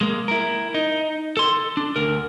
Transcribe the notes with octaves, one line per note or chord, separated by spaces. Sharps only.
G#3 A#3
E4 A#4
D#4
A4 C6
D4
D2 A#4